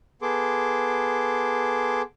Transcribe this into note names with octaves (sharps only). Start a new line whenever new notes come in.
B3 G#4 A4 C6 D6